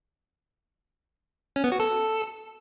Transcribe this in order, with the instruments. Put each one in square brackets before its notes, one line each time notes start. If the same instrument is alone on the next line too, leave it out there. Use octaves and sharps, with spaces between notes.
[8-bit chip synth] C#4
B3
F#4
A4